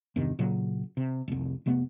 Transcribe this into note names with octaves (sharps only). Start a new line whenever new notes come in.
E2 G2 C3 D#3
A#2 C#3 F#3
C3
F1 C2
F1 C3 A3 B3